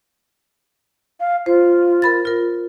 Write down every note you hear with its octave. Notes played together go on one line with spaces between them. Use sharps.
F5
F4 C5
A#4 B5 A6
F4 A#4